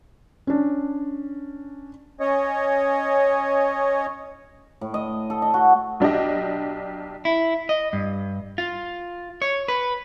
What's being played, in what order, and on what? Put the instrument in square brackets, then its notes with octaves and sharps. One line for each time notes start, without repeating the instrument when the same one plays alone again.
[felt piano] C#4 D4
[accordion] C#4 C#5 D#5
[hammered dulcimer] A2
D#5
A4
D#5
F#4
[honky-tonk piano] B1 D4 G4 D#5
[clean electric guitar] E4
D#5
G2
F4
C#5
B4